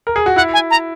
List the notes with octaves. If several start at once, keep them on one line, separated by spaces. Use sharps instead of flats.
A#4
G#4
F#4
E4 F#5
G#5
A#5